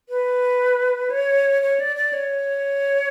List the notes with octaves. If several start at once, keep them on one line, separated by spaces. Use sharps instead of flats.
B4
C#5
C#5
D5
D5
C#5